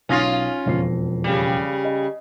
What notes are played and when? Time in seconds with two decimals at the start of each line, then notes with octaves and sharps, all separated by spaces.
0.09 B1 C#4 F4 D#6 A#6
0.66 E1 F2 C7
1.24 C#3 G3
1.85 D#5